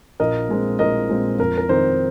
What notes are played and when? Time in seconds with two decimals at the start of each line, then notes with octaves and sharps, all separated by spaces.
0.20 A#1 A#4 D#5
0.49 A#2 G#3 C4
0.79 A#1 A#4 D#5
1.09 A#2 G#3 C4
1.39 F2 A#4
1.58 A#4
1.69 D#3 C4 D#4 C5